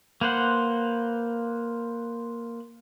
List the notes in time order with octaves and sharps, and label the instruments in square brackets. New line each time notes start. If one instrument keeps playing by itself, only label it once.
[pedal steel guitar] A#3 B4 C5 F#5